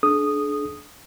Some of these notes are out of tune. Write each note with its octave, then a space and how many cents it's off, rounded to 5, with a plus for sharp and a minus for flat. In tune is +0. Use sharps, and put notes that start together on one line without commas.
D4 +0 G#4 +45 D#6 -10